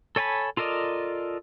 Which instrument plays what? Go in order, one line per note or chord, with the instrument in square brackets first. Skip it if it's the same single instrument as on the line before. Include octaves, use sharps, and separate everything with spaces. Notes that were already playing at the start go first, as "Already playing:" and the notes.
[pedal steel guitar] A4 C#5 G#5 A5 B5
F4 A4 A#4 D5 D#5